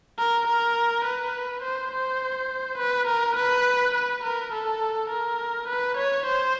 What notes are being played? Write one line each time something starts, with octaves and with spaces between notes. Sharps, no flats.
A#4
A#4
B4
C5
C5
B4
A#4
B4
B4
A#4
A4
A#4
B4
C#5
C5